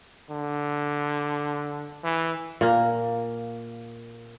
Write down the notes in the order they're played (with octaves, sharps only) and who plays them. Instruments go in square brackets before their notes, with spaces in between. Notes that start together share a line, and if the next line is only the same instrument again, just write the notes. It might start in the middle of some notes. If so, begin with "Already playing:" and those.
[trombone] D3
E3
[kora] A#2 A#3